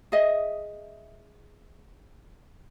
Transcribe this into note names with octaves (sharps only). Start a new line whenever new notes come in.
G#4 D#5 E5